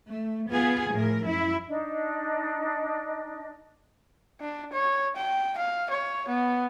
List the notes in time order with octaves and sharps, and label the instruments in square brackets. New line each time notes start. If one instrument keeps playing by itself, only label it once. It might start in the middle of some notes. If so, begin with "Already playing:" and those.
[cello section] A3
B3 F4 G#4
A2 F3 A#4
F#2 E4
[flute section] D4 D#4 D#5
[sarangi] D4
C#5
G5
F5
C#5
B3